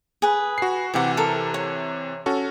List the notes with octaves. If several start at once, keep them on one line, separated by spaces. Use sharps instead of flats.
G#4 B4
F#4 C7
C3 E3 G4 F#5
A4 A#4
C#5
C#4 F#4 A4